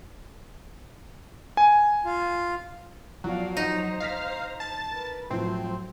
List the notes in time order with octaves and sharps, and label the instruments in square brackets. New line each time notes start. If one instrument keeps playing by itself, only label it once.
[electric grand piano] G#5
[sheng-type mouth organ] F4
[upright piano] E2 F3 [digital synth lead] F#3 [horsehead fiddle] D5 F5
[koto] D#4 [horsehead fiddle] C5 A#5
[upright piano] D#5 A#6 B6 [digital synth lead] F5
[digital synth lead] A5
[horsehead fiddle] A#4 B4
[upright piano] A2 F3 [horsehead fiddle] F#3 [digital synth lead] C4